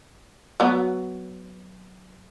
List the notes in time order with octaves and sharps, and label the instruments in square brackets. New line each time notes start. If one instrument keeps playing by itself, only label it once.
[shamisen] F#3 B3